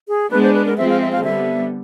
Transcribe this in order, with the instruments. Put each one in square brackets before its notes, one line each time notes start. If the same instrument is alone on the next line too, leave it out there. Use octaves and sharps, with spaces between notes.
[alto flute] G#4
[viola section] G#3 B3 D4 [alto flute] B4
[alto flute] C5
B4
A#4
[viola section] F3 G#3 C4 [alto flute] E5
[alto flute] F5
E5
F5
[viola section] D3 G3 B3 [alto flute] E5